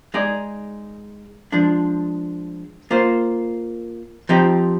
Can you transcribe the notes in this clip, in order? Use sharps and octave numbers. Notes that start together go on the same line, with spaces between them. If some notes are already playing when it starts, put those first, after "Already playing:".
G#3 D#4 G#4 D5
F3 G#3 D4
A#3 F4 C5
F3 C4 D#4 G4